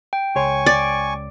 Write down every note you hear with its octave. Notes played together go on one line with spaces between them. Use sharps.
G5
C#2 C#5 G#5 C6 C#6
D5